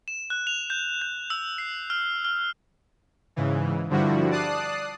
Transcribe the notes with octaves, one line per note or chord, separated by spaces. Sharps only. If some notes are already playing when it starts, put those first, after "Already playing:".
E7
F#6
F7
G6
G6
E6
C7
F6
F6
G#2 C#3 E3
G2 D3 F3 G3 E4 F#4
D5 A5 D#6 F#6 C7